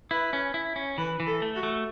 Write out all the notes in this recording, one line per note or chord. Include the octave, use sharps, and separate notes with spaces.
E4 B4
C#4
E4
C#4
E3 B4
E3
A4
A3
F#4
A3